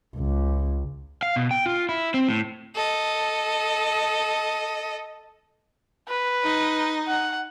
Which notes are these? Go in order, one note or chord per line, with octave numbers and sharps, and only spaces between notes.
C#2
F5
B2
G5
F4
E4
C4
A2
A4 D#5
B4
D#4
F#5